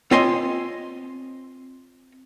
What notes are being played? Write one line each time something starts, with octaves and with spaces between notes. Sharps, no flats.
C4 F4 C#5 D#5 G#5 C6